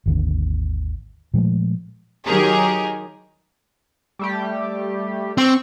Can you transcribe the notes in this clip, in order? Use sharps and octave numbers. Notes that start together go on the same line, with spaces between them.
G#1 D#2 D3
A#2 F3 G#3 A3
D#3 F#3 G4 G#4 A#4
G3 A3 G4
C4 C#6 E6